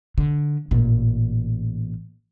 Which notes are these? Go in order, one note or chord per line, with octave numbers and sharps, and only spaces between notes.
D3
A1 A#2